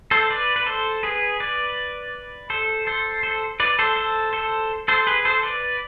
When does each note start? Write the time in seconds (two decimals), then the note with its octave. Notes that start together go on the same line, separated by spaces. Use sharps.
0.11 A4 C5
0.31 B4 D5
0.56 B4
0.66 A4 C5
1.03 G#4 B4
1.40 B4 D5
2.50 A4 C5
2.87 A4 C5
3.23 A4 C5
3.60 B4 D5
3.79 A4 C5
3.96 A4 C5
4.33 A4 C5
4.88 A4 C5
5.07 G#4 B4
5.25 A4 C5
5.43 B4 D5